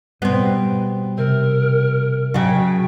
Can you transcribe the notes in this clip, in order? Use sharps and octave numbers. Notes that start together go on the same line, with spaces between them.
B2 G3 B3 C4
C3 A#4
C#3 F#3 F#4 G5 A5 B6